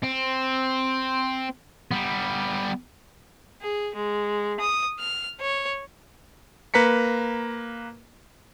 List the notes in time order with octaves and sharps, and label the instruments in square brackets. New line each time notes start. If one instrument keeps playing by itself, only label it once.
[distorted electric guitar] C4
G3 B3
[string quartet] G#4
G#3
D#6
F6
C#5
[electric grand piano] A#3 B4 A#5 B6 C#7